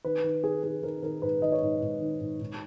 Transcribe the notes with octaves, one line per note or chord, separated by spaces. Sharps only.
D#3 B4
D#3
D#3 G#4
D#3 G#4
D#3 A#4
D#3 A#4
G#2 B4
D#3 D#5
C#5
G#2
G#2
D#3
G#2
G#2